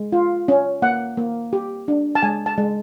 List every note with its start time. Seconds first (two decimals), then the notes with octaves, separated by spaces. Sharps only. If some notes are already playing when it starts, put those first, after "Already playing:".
Already playing: G#3
0.12 F4
0.48 C#4
0.82 A#3 F#5
1.17 A#3
1.53 G4
1.88 D4
2.15 A5
2.22 G#3 G#5
2.46 A5
2.58 G#3